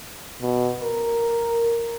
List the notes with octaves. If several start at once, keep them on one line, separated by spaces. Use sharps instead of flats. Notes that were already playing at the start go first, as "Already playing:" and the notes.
B2
A#4